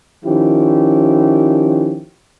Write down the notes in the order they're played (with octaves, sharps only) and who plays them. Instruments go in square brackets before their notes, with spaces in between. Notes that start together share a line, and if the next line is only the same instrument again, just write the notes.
[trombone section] D#3 F3 C#4 E4 G4